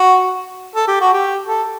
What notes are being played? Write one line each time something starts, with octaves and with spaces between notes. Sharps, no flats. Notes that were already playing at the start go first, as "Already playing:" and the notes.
Already playing: F#4
A4
G4
F#4
G4
A4